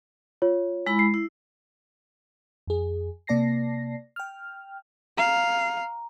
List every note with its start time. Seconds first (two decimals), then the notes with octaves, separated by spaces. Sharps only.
0.42 F4 C#5
0.87 G#3 E4 B5
0.99 C7
1.14 E4
2.67 F2 G#4
3.27 C3 A#3 D5 A5 A#6 C7
4.16 G5 F6
5.18 F5 A#5